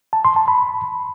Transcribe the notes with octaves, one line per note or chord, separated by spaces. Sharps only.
A5
C6
A5
B5